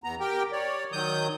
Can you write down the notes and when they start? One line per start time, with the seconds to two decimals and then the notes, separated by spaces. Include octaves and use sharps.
0.04 E2 B3 A#5
0.20 G4 A#4 G5
0.52 C#5 D5
0.92 D#3 F#3 D#6 G6